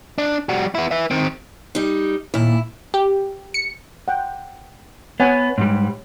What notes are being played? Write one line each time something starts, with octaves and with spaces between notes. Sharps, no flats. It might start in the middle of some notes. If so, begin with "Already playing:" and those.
D4
G3 F#4
B3 E4
B4 E5
D#3 C4
G3 D#4
D#2 A#2 E4
G4
C#7
F#5 G5
B3 C#5 F#5 G#5
G#2 G3